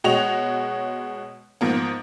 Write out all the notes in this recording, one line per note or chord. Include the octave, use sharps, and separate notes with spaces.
B2 G#3 F#4 C#5 D#5 F7
G#2 F3 A#3 B3